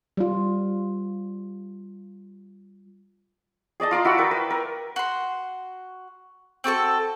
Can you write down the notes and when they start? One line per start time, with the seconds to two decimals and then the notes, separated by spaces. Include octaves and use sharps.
0.17 G3 F4
3.80 G#4 D5 D#5 A5
3.91 F4 D5 A#5 C6
4.05 E4 F#4 F#5 E6
4.18 A#4 B4 G5
4.31 B4
4.50 A#4
4.96 F#4 C6
6.64 C4 F#4 A4 C#6